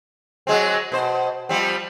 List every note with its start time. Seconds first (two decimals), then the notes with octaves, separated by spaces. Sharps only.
0.47 F#3 G#3 C4
0.92 B2 C5
1.49 F3 G3 C4